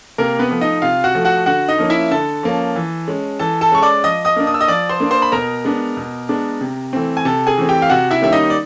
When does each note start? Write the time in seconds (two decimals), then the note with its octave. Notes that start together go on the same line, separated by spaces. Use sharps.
0.18 C3 A#3 A#4
0.39 B3 B4
0.50 F3 A3
0.61 D#4 D#5
0.82 C3 F4 F5
1.04 F#4 F#5
1.15 F3 A3
1.25 F#4 F#5
1.46 D3 F#4 F#5
1.68 D#4 D#5
1.78 F3 A#3 C#4
1.90 E4 E5
2.11 D3 A4 A5
2.43 F3 A#3 C#4
2.76 E3
3.08 G#3 C#4
3.39 E3 A4 A5
3.61 A4 A5
3.72 G#3 C#4 C#6
3.82 D5 D6
4.04 F3 D#5 D#6
4.25 D#5 D#6
4.36 A#3 D4
4.47 D#6
4.54 E6
4.61 D#5 D#6
4.68 F3 D5 D6
4.89 C5 C6
5.00 A#3 D4
5.11 C5 C6
5.22 B5
5.32 B2 A#4 A#5
5.65 G#3 B3 D4
5.97 B2
6.29 G#3 B3 D4
6.61 C3
6.93 E3 A3 C4
7.17 G#5
7.25 C3 A4 A5
7.47 G#4 G#5
7.57 E3 A3 C4
7.69 G4 G5
7.82 F5
7.90 C3 F#4 F#5
8.11 E4 E5
8.22 D#3 G3 A#3 C#4 E5
8.33 D#4 D#5
8.50 D5